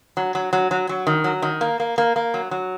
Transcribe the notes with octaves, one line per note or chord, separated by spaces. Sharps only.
F#3
F#3
F#3
F#3
F#3
D#3
F#3
D#3
A#3
A#3
A#3
A#3
F#3
F#3